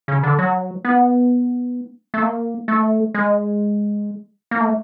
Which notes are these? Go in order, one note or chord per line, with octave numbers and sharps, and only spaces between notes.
C#3
D3
F#3
B3
A3
A#3
A3
G#3
A#3
A3